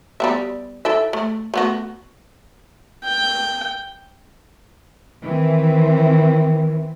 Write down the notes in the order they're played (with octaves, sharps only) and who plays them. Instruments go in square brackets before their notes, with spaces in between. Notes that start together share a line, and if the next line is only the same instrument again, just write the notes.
[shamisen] G3 B3 E5
E4 A4 E5
A3
A3 B3 F#4
[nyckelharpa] G5
[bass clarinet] D#3 [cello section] E3 C4